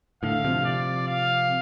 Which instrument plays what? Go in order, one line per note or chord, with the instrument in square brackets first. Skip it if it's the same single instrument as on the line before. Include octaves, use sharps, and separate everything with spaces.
[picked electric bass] A2 D3 [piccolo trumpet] F5
[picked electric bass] C3 F3
[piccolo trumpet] D5
F5